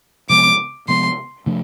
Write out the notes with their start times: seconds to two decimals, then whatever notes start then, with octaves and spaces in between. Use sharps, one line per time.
0.30 C3 F3 G#3 B3 D6
0.88 C3 F3 G#3 B3 C6
1.46 C3 F3 A3 D4